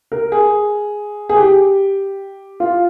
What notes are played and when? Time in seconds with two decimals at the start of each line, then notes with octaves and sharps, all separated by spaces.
0.12 A#4
0.32 G#4
1.30 G#4
1.37 G4
2.60 F4